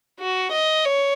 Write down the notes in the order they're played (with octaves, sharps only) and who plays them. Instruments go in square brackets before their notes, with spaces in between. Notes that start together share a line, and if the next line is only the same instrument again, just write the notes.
[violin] F#4
D#5
C#5